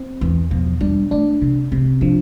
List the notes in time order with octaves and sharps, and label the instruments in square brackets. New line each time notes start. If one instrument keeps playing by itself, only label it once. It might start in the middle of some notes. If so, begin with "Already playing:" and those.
Already playing: [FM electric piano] C4
[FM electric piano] E2 [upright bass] E3
[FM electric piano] B2 [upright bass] F3
[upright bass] G3 [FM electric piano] D4
[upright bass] A3 [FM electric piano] D4
[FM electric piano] C3 [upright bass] C4
[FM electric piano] C3 [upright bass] C4
[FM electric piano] F3 [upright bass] D4